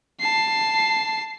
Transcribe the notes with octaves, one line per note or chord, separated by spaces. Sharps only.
A5 C7